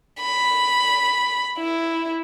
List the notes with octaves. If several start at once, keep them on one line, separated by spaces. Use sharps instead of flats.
B5
E4